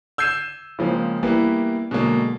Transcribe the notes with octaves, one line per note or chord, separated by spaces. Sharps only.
E6 G6 G#6 C7 D#7 E7
C#3 F3 G#3 A#3 C4
E3 G3 A#3 B3
B2 D3 F#3 G#3 A#3